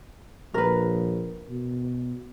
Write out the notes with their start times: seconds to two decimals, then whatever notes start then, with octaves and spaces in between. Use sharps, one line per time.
0.54 A#1 A#4 B4
1.49 B2